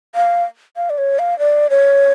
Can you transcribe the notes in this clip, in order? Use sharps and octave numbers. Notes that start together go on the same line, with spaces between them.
F5
F5
D5
C#5
F5
D5
C#5